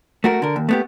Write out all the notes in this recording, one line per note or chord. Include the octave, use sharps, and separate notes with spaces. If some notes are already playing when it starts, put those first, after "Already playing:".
A3 F#4 A#4
D3 A#4
D#2
A3 B3 G4